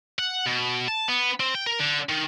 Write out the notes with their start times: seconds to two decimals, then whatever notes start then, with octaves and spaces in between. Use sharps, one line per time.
0.19 F#5
0.46 B2
0.88 A5
1.08 B3
1.40 C4
1.55 G5
1.67 A#4
1.79 D3
2.09 D#3